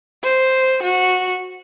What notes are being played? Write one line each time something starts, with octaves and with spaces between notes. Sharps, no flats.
C5
F#4